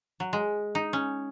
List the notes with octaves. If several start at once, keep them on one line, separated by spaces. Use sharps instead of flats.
F#3
G#3
D#4
C#4